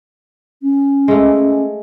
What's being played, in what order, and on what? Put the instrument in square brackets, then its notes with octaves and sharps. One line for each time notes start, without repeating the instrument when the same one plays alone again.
[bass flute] C#4
[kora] G#3 A3